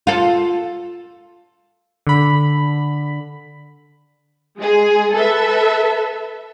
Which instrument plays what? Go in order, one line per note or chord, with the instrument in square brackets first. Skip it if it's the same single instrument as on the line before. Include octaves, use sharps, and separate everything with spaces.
[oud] F4 A4
[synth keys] D3 B5
[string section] G#3 G#4
A4 B4 E5